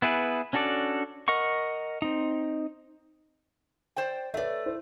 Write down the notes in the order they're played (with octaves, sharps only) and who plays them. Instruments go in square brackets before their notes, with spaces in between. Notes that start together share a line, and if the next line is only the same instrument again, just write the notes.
[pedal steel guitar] B3 E4 G#4 B4
C#4 D4 F#4 A4 D5
A#4 D#5 F#5 C#6
C4 D#4
[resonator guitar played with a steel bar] C5 D5 G5
[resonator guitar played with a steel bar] A3 D5 [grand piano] B4 C#5 E5
[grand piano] E4 C5